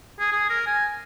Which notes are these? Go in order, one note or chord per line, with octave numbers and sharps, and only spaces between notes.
G#4
G#4
A#4
G#5